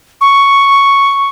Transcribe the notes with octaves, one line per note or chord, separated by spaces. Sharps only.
C#6